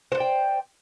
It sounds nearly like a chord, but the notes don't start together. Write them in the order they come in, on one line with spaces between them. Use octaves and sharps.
C5 F#5 D5 G5